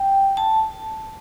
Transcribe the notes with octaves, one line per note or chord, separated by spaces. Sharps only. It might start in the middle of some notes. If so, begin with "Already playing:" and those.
Already playing: G5
A5